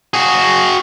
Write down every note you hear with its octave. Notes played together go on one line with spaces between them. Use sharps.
F#4 G#4